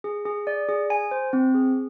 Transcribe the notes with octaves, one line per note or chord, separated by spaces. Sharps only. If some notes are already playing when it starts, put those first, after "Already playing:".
G#4
G#4
D5
G#4
G#5
C5
C4
G#4